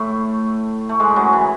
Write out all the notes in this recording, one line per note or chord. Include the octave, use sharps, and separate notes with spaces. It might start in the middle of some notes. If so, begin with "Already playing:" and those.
Already playing: A2 A3
A3
G#2 G#3
F#2 F#3
E3